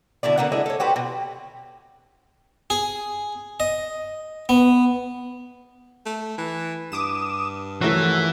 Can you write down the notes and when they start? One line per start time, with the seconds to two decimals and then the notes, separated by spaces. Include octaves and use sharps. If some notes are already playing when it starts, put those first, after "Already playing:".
0.23 B2 D3 E4 D5
0.38 D3 A#3 B3 F#5
0.52 G#3 D4 E4 D#5
0.66 A4 C#5
0.80 F#4 G4 B4 C5
0.96 B2
2.70 G#4
3.60 D#5
4.49 B3
6.06 A3
6.38 E3
6.92 G2 D6 D#6 E7
7.81 E3 F3 A3 C#4 F#4 A#4 E5